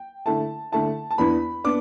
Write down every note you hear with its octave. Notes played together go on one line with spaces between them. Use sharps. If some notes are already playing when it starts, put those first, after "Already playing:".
Already playing: G5
D3 A3 E4 A5
D3 A3 E4 A5
A5
E2 E3 B3 D4 B5
B3 D4 D6